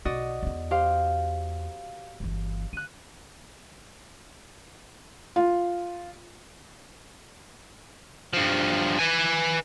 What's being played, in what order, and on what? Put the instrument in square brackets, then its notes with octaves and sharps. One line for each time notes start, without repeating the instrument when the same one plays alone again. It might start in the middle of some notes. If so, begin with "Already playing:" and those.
[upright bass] B1 D#4 [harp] F#4 D5 D#5
[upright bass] E2 D#4
[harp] G4 C5 F5
[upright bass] G1 E3
[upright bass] D3 [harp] F#6 D#7
[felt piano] F4
[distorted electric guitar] G2 F3
B4 G#5